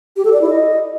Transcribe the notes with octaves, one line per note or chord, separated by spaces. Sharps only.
G4
A4
D5
E4
D#5